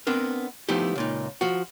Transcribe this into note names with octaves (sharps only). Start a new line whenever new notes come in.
B3 C4 D4 A#4
F3 A3 B3 D#4 E4 G4
C#2 A#2 D#4
F3 F#4